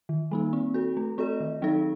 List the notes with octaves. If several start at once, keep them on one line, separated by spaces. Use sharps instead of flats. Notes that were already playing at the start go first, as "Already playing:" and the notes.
D#3
G3 A#3 D#4
C4
F#4 A4
A3
C4 F#4 A4 D#5
D#3
F#3 C4 D#4 A4